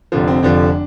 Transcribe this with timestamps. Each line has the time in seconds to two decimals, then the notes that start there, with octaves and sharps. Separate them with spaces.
0.12 F1 F2 D3 F3
0.28 C4
0.43 F1 F2 D3 F3 D4